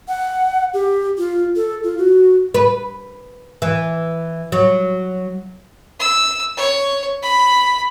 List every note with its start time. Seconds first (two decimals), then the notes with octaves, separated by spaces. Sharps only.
0.08 F#5
0.74 G4
1.18 F4
1.56 A4
1.83 F4
1.98 F#4
2.54 B4
3.62 E3
4.52 F#3
5.99 E6
6.57 C#5
7.22 B5